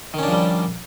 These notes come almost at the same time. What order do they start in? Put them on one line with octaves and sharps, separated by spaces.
D#3 C#4 D4 F3 G3